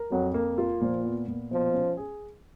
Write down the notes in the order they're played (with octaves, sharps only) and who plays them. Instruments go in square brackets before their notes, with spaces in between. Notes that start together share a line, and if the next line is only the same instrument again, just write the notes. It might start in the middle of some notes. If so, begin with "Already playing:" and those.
Already playing: [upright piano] A#4
[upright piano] F2 [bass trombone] F#3
[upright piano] A#3
F4
[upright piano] A#2 [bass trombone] F3
[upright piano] B3
A#2
[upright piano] B2 [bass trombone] F3
[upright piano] C#4
G#4